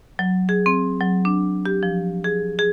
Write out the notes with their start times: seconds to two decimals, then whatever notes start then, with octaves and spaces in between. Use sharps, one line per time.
0.19 F#3
0.49 G#4
0.66 C4
1.00 F#3
1.25 D4
1.66 G4
1.83 F3
2.24 G#4
2.59 G#4